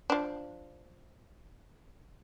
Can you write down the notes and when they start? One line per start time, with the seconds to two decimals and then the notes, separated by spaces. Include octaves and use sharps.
0.10 F3 D4